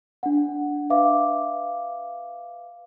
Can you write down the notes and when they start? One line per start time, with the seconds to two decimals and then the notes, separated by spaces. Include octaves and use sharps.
0.23 D4 F#5
0.90 B4 E5 F5 D6